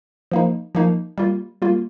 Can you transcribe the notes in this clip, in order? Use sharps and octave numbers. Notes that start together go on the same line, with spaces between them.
F3 A#3 D#4
F3 A#3 D#4
G3 A#3 F4
G3 A#3 F4